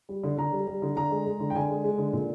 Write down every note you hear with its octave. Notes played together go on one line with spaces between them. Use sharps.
G3
D3
D3 A#5
G3
G3
D3
D3 A#5
G#3
G#3
D3
G5
D3 G#5
G#3
G#3
D3
A#2